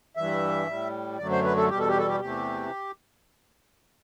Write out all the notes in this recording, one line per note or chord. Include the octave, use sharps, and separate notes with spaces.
G2 E3 G3 E5
A2 G3
F#2 D3 F#3 A3 D5
C5
B4
A4
E2 B2 G3 G4
A4
G4
A4
G4
E2 C3 E3 A3 G4